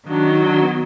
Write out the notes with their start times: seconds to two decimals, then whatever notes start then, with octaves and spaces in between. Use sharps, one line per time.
0.08 D#3 F#3 D4
0.26 D#4
0.43 D4
0.56 D4
0.62 B3